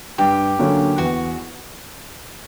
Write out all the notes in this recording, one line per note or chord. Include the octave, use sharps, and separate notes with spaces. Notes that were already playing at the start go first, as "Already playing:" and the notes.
G2 G4
D3 F#3 A#3 C#4
E2 F#4